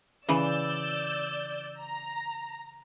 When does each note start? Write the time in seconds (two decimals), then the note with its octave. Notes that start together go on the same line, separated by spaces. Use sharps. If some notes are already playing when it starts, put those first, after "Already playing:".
0.29 C#3 E3 D5 E6 G6
1.80 A#5